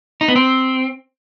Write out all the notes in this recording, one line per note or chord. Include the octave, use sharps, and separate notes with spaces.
D#4
B3
C4